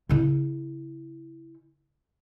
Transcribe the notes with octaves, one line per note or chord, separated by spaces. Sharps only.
C#3 E4